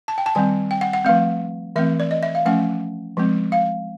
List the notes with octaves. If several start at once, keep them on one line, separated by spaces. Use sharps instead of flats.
A5
G5
A5
D#3 G3 C4 G#5
G5
F#5
F#5
F3 A3 C4 F5
E3 A3 C4 E5
D5
D#5
E5
F5
F3 A3 C#4 F#5
F3 G#3 C4
F5